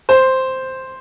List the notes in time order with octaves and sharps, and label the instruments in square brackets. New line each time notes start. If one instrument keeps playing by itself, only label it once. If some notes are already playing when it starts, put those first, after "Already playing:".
[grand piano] C5